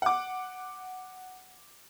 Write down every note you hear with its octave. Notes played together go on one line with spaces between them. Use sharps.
F#5 D6